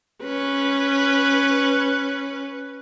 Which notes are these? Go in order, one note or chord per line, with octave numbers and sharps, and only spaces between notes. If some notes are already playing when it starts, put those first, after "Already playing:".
C#4 B4